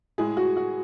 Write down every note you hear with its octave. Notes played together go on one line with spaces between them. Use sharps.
A2 G#3 G#4
F#4
F#4